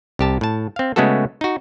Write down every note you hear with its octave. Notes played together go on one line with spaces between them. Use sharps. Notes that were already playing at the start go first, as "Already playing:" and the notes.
C2 G4 A5
A2 A5
C4 F5
C#3 G#3 A3 B3 F#4 A4
D#4 F#4